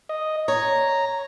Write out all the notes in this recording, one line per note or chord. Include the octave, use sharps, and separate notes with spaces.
D#5
C#5 A#5